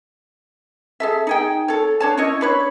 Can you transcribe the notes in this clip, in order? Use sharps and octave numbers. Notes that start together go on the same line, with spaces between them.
G#4 A4 E5
D#4 G#4 G5
A4 C#5
D4 C#5 A5
C#4 E4 C#5 D#5
D4 B4 C#5